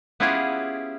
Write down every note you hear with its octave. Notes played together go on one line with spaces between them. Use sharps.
B3 C#4 E4 F4 G4 G#4